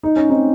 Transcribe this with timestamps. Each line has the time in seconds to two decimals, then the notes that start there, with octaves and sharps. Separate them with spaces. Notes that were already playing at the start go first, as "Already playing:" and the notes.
0.03 D#4
0.16 C#4
0.30 C4 D#4